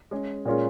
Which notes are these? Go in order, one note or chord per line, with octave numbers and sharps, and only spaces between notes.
G#3 C#4 G#4
A#2 G#3 C#4 F4 A#4